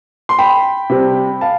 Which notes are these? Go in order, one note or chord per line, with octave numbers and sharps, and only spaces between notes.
C6
G5 B5
C3 G3 C4
F5 A5